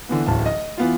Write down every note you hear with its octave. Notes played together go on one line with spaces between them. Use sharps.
D3 E3 B3
D1 A1 A5
D#5
E3 B3 F4